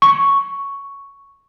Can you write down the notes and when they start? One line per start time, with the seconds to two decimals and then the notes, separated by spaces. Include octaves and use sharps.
0.02 C#6